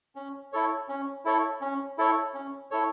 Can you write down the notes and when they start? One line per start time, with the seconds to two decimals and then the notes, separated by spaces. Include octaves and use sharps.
0.16 C#4
0.53 E4 A4 C#5
0.89 C#4
1.25 E4 A4 C#5
1.61 C#4
1.98 E4 A4 C#5
2.34 C#4
2.71 E4 A4 C#5